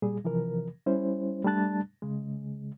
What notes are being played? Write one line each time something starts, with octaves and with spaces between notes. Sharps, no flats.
A#2 G3 G#4
C3 E3 F3 A#4
G3 C#4 E4 C5
G3 A3 D4 A5 F#6 A6
C#3 G#3